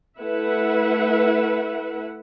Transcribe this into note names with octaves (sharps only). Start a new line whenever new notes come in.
A3 E4 B4 E5 F#5